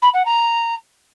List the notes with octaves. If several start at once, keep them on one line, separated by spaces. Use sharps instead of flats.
B5
F#5
A#5